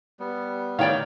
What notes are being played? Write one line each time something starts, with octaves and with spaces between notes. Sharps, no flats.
G3 B3
A2 D#3 C#5 D5 F5 G5